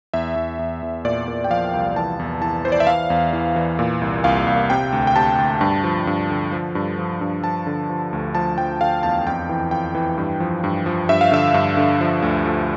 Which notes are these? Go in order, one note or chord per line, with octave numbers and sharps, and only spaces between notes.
E2 E5
E2
E2
E2
A#2 D5
A#2
G5
F3 F5
C2
E3 A5
E2
E3 A5
E3 C5
D5
E5
E3 F5
E2
E3
E3
A#2
C2
C2 F5
C2
C3 G5
D2
G5
C3 A5
D2
G2
F3
G2
D3
F3
G2
F3
G2
F3 A5
D3
F3
D2
F3 A5
F3 G5
D3 F5
E2 A5
F2 G5
E3
F2 G5
E3
G2
F3
G2
F3
G2 E5
F5
D3 E5
G2
D3
F3
D2
F3